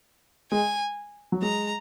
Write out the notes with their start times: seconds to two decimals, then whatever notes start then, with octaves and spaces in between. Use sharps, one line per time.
0.52 G#3 G#5
1.32 F#3
1.42 G#3 A#5